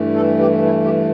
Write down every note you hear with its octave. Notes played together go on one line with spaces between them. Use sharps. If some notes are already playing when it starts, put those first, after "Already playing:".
Already playing: G2 E3 A3
A4
G4
E4
G4